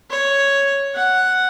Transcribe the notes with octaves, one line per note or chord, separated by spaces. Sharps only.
C#5
F#5